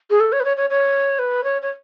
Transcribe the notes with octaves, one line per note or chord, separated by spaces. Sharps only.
G#4
A4
C#5
B4
C#5
C#5
C#5
B4
C#5
C#5